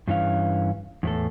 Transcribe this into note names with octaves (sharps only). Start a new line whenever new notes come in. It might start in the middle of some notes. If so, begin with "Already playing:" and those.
G2 E3 C#4 F5
E2 A2 A4